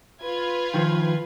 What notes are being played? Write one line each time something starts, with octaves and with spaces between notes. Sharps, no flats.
F4 B4 G#6
D#3 F3